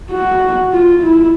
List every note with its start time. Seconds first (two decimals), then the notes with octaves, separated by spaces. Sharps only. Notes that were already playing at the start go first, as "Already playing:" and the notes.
0.11 F#4
0.73 F4
1.03 E4